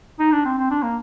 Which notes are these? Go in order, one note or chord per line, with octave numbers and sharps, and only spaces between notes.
D#4
D4
C4
C4
D4
A#3